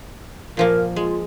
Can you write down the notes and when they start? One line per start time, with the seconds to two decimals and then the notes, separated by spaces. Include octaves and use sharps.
0.57 A#2 F3 A#3 A#4
0.96 G#3 F4